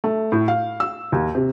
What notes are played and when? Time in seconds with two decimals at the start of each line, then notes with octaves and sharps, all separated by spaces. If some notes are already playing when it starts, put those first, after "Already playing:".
0.04 A3
0.32 A2
0.48 F5
0.80 E6
1.12 D#2
1.35 C3